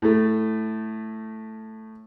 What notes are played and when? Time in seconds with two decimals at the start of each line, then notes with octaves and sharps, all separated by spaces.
0.02 A2 A3